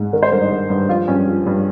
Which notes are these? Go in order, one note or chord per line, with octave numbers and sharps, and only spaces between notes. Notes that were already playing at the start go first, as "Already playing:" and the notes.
Already playing: G#2
D#3 A#4
C5
G2 A#4
D#4
D#3
G2
F3 F4
G2 C#4
F3
G2